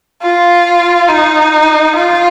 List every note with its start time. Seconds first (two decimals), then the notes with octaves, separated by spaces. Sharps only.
0.22 F4
1.09 D#4
1.96 F4